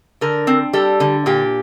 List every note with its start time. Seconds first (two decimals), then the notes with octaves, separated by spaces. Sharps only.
0.21 D3 A#4
0.47 C4
0.73 G3 A4
1.00 D3
1.26 A#2 G4